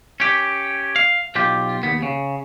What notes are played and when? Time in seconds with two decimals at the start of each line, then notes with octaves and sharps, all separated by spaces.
0.20 C#4 G4
0.96 F5
1.36 B1 F4 G4
1.83 D#2 B3
2.02 C#3